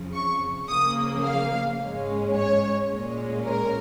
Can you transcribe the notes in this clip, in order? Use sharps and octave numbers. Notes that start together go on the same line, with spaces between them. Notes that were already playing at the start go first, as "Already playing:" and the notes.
Already playing: F2 C#3 F3
C#6
C#3 F3 A#3 D#6
F5
G#2 G#3 C#4
C#5
A#2 G#3 C#4
A#4